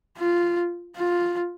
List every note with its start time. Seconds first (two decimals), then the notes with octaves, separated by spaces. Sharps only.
0.17 F4
0.96 F4